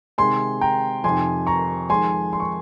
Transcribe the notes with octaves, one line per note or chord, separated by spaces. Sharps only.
C3 D#3 G#3 G#5 C6
G5 A#5
F2 C3 D#3 G#5 C6
A#5 C#6
F2 D#3 G#3 G#5 C6
C6
C#6